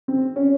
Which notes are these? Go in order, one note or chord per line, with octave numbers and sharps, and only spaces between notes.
C4
C#4